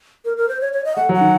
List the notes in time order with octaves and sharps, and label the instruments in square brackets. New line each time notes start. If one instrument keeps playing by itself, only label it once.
[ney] A#4
A#4
C5
C#5
C#5
D#5
[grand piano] A3 [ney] F#5
[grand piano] F#3
[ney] F#5
[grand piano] D#3